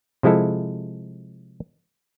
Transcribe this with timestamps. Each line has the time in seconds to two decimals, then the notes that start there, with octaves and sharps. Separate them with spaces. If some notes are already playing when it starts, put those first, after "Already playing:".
0.23 C3 F3 G#3 E4 A4